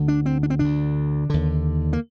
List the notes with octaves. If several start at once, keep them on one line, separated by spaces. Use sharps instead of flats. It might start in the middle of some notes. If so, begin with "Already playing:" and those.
Already playing: D2 D3
D4
C4
D4
C4
D2 D3 D4
D#2 D3
A#3